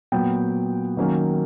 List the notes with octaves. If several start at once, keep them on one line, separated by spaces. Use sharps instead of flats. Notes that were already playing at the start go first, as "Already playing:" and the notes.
A#2 F#3 B3 G5
D#3 F#3 A#3 C#4